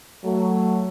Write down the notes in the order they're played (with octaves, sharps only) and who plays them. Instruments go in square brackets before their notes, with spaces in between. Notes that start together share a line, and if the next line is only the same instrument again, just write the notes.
[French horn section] F#3 A3